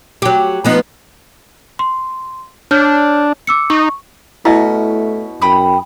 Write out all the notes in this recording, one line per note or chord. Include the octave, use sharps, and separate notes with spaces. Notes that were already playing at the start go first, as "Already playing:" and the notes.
F#3 G4
F3 B3 D#4
C6
D4 C#5 F6 G6
D6 E6 C#7
D#4 C#6
B2 A3 C#4 E4 E5
F#2 G5 B5 D#6